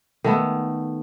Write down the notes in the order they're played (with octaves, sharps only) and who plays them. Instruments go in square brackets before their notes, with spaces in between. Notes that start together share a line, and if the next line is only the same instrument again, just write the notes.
[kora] D#3 A3 B3